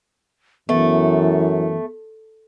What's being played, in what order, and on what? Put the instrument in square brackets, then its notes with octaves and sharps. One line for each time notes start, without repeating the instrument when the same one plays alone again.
[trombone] F#2 [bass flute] E3 [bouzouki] A3 [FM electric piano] B3